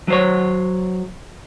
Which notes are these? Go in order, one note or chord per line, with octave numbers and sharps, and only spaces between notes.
F#3 C5 C#5